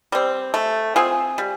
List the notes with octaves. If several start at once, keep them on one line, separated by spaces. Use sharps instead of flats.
G3 C4
A3
C4 F4 G#4
G3